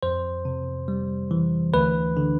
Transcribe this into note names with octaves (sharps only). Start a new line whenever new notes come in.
F2 C5
C3
G3
E3
D2 B4
D3